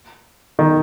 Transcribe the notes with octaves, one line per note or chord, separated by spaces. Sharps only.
D#3